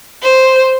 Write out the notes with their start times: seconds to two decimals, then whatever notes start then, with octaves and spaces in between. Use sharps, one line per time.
0.22 C5